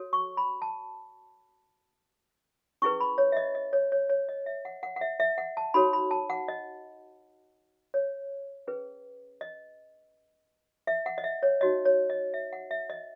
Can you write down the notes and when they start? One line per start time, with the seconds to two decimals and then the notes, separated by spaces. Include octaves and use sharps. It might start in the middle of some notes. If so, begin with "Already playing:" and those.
Already playing: F#4 A4 C#5
0.13 C#6
0.37 B5
0.62 A5
2.82 C#4 E4 G#4 B4 C#6
3.00 B5
3.18 C#5
3.32 E5
3.37 D#5
3.55 D#5
3.73 C#5
3.92 C#5
4.10 C#5
4.29 D#5
4.46 E5
4.65 F#5
4.83 F#5
4.96 F#5
5.01 E5
5.20 E5
5.38 F#5
5.57 A5
5.74 D#4 F#4 A4 C#5 B5
5.93 B5
6.11 A5
6.30 F#5
6.48 D#5
7.94 C#5
8.67 C#4 G#4 B4
9.41 D#5
10.87 E5
11.06 F#5
11.18 D#5
11.24 E5
11.43 C#5
11.61 D#4 F#4 C#5 D#5
11.85 C#5
12.10 D#5
12.34 E5
12.53 F#5
12.71 E5
12.90 D#5